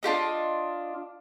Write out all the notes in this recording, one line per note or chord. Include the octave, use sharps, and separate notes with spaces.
D4 F4 G4 D#5